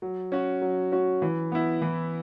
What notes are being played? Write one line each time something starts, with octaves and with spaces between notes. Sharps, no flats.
F#3
C#4 F#4
F#3
C#4 F#4
E3
B3 E4
E3